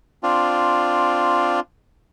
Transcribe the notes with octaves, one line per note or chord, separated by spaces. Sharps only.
C4 D4 F4